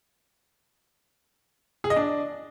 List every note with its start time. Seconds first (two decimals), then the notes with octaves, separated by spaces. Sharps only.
1.84 G#4
1.90 D#5
1.96 D4